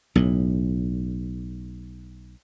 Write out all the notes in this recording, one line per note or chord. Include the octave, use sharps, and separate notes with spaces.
B1 A2